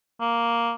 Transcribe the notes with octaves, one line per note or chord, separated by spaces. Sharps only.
A#3